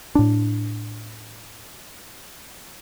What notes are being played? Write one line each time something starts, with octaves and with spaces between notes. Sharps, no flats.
A2 D4